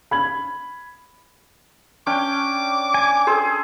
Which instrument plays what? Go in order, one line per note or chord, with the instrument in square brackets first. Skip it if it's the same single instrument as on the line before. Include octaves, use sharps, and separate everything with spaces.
[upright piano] B5 G#6 F#7
[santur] C#4 D4 G5 [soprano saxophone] D6
[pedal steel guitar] G#5
[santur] G#4 A4 C5